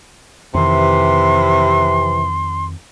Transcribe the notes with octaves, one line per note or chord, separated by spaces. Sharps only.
F2 C3 D#3 E3 C6